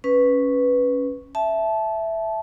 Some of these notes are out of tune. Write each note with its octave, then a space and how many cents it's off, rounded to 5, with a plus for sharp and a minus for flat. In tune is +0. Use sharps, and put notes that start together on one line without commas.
C#4 +0 B4 +0
E5 +0 A5 -20